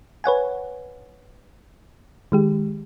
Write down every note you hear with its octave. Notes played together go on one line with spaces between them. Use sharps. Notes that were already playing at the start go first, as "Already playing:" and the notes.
B4 C#5 F#5 G#5
D#3 G#3 G4